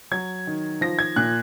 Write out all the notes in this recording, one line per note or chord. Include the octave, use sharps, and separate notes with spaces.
F#3 G#6
D#3
F3 A#6
G#6
A#2 F#6